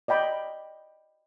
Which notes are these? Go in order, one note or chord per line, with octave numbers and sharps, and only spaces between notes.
D5 D#5 G5 B5